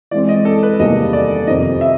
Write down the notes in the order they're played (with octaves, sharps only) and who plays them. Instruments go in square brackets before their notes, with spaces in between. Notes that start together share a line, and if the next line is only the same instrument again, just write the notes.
[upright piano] E3 G#3 C4 [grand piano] D5
[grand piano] D#5
A4
B4
[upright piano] E2 C3 D#3 G3 A#3 [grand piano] D#5
[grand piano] D5
[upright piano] F2 C3 D#3 [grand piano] D#5
[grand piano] E5